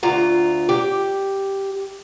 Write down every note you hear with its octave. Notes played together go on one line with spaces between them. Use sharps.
D2 F4 A#5
G4